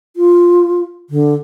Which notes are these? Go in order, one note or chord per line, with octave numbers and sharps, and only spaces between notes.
F4
D3